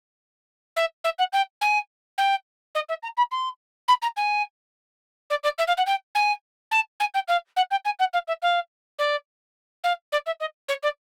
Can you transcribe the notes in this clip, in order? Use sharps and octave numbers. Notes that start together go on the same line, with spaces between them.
E5
E5
F#5
G5
G#5
G5
D#5
E5
A#5
B5
C6
B5
A#5
G#5
D5
D5
E5
F5
F#5
G5
G#5
A5
G#5
G5
F5
F#5
G5
G#5
F#5
F5
E5
F5
D5
F5
D5
E5
D#5
C#5
D5